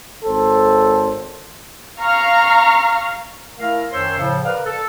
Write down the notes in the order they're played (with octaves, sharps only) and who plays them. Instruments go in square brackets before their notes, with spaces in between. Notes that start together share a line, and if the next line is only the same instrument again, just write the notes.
[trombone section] G#1 A4 C5
[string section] F5 A#5 C#6 F6
[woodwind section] A3 E4 A#4 F5
F#2 D#3 C5 C#5 C6 E6
A2 C#3 F3
A#4 B4 D5 F5
A4